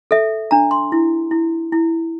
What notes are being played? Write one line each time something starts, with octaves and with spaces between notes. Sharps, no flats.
A4 E5
D4 A#5
C6
E4
E4
E4